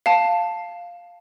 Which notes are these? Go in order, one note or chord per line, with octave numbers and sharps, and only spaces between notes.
F5 A5